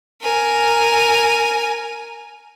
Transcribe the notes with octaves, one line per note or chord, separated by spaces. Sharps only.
A#4 G#5